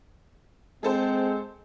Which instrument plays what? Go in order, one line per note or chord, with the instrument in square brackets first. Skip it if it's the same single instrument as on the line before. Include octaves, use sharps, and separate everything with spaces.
[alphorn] G#3 [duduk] C4 [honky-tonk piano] G#4 A4 C5